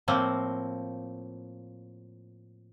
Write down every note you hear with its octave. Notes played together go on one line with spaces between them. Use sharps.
A2 F3 A#3 C4